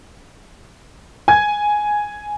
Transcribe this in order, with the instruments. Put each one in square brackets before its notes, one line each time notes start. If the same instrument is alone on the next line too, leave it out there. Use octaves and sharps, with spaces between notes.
[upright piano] G#5 G#6